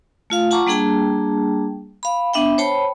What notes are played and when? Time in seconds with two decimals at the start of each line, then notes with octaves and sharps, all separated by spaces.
0.30 A3 F4 F5
0.51 F4 F#5 A5 A#5 C#6 D6
0.67 G3 A#3 D4 G#4 G5 A5
2.03 F5 B5
2.34 B3 D4 E5 G5
2.58 C5 C#5 G5 A5 B5